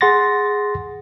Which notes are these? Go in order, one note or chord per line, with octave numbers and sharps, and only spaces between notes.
G#4 F#5 C6 A6 A#6